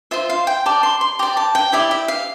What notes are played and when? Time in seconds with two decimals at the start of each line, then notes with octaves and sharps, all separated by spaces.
0.11 F4 C5 E5
0.30 F5
0.47 G5
0.66 G4 D5 A5
0.83 C6
1.01 C6
1.19 G4 D5 A#5
1.37 A5
1.55 G5
1.72 E4 G4 D5 E5
1.91 E5
2.08 F5